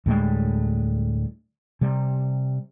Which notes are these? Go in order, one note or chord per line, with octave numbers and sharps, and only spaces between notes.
D2 A2 G3 G#3
C3 G3